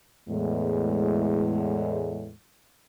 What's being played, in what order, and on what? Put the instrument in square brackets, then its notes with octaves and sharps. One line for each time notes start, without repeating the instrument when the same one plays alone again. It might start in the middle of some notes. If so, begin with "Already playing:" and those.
[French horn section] E2 A2 G#3